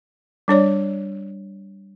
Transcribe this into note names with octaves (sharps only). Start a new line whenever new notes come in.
G3 D4 C#5 D5